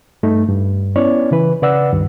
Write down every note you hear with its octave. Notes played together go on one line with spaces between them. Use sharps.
G2 A3 D#4
G2
B3 C#4 E4 C#5 D5
C#3 E3 B4
C#3 B4 D5 F#5 E6
C#2 G2 D#3